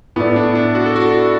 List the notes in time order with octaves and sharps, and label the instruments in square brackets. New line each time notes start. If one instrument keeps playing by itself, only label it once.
[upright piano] A2 A3 E4 D5 [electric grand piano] B3
[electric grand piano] D4
D4
F#4
A4
F#4